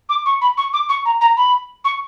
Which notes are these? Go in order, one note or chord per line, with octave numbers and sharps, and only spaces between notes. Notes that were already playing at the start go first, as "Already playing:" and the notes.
D6
C#6
B5
C#6
D6
C#6
A#5
A#5
B5
C#6